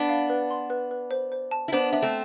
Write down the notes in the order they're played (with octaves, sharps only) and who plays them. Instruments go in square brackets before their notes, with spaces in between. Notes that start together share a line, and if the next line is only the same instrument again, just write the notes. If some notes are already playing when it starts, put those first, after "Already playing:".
Already playing: [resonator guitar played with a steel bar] B3 D4
[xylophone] F5
B4
C6
B4
B4
C5
C5
A5
[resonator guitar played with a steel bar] E4
[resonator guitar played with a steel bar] B3 D4 [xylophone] C5
[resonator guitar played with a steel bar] D4 [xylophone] E5
[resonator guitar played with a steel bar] A3 C4